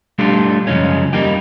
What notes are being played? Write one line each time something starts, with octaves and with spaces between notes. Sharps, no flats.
G3 A3 D4 F4 G4 A4
F#2 C#3 F3 G#3 C#4
G3 A#3 D#4 G4